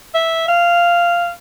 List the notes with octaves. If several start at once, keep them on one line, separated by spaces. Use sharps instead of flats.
E5
F5